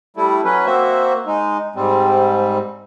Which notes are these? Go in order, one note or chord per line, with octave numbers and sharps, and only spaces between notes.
G3 A3 E4
F#3 C#4 B4
A#3 C4 F#4 C5 E5
G#3 D#4
G#2 G3 C4